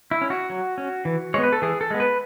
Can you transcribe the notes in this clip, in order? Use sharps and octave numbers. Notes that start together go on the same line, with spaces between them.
E4
C#4
F#4
F#3
C#4
E3
G#3 B3 C#5
B4
A4
E3 G#4
A4
G#3 B3
B4